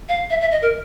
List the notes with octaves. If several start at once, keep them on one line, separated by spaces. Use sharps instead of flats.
F5
E5
E5
D#5
A#4